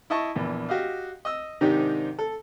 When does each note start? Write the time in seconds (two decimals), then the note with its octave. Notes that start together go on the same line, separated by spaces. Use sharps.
0.10 E4 D#5 A5 C#6
0.35 A#1 E2 E3
0.69 F#4 G4 D#5 F5
1.25 D#5 E6
1.61 G#2 C3 D#3 D4 D#4 G4
2.18 A4